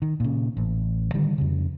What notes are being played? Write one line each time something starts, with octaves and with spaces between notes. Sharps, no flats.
D#3
A#2 C#3
A1
D3 D#3 G3
F2 C#3